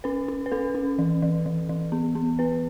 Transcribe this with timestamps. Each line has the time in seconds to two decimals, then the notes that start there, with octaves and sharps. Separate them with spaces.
0.04 C#4 B4
0.28 C#4
0.46 B4
0.52 C#4 A4
0.75 C#4
0.99 E3
1.22 E3
1.46 E3
1.69 E3
1.92 B3
2.15 B3
2.39 B3 B4